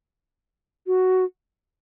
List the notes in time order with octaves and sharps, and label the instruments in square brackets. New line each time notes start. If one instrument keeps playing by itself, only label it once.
[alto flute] F#4